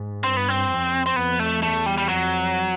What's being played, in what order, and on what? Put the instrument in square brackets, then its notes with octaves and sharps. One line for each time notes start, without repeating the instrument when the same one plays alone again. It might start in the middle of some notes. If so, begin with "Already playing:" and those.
Already playing: [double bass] G#2
[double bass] G2 [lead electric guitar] C4
[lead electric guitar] B3
C4
[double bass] F2
[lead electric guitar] C4
[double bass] F2 [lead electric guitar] B3
[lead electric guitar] A3
[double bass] E2 [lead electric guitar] A3
[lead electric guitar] G3
G3
[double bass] F2 [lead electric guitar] F#3